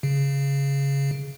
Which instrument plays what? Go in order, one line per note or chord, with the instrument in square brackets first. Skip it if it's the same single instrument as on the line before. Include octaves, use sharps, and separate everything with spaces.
[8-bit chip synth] C#3